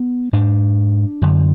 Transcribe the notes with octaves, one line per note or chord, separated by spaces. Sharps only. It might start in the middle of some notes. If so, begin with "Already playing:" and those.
Already playing: B3
G#2 D4
F#2 D3